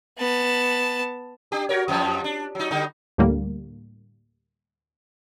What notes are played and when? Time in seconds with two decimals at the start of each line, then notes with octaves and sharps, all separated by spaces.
0.18 B3 A5
1.52 D4 G4
1.69 F#4 A#4 C#5
1.88 F2 F3 G3
2.24 D4
2.55 F#3 D#4
2.71 D3 G3 D#4
3.18 D2 A2 D3 G3 A#3